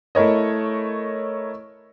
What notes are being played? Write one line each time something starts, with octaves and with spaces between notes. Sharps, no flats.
A3 E4 A#4 C#5 D#5